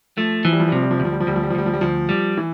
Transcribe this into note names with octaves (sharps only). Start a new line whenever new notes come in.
F3 A3
E3 F3
G3
F3
G3
C3 F3
G3
F3
D2 G3
F3
G3
F3
D2 G3
F3
G3
F3
D2 G3
F3
G3
D2 F3
G3
E3